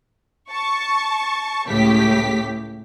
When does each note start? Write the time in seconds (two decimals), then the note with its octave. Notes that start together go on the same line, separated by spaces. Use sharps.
0.49 A5 C#6
1.67 C#2 A2 C#3 A3 G4 B6